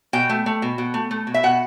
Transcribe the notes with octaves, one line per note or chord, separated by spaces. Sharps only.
B2 G5
A3
A3
B2
B2
A3
A3
B2
E5
B2 F#5